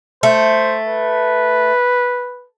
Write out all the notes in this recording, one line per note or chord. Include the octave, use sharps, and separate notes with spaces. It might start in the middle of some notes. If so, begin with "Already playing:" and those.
A3 C5
B4